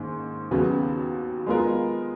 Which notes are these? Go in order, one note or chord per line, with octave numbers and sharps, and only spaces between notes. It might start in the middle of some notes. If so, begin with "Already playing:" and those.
Already playing: G#2 D#3 A#3 C#4
D#2 C#3 F#3 B3 F#4
G#3 B3 F4 A#4